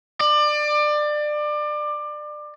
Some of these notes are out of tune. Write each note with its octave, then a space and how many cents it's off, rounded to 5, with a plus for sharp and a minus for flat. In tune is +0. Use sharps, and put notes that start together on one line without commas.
D5 +25